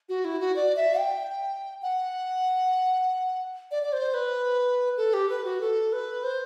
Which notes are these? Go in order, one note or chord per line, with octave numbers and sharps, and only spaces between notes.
F#4
E4
F#4
D5
E5
G5
F#5
D5
D5
C5
B4
A4
G4
B4
F#4
A4
B4
C5